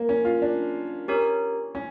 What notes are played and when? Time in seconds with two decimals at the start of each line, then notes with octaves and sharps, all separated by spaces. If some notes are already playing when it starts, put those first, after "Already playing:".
Already playing: A#3
0.09 C#4
0.25 F4
0.42 D4
1.08 C#4 G4 A#4 C#5
1.75 C#4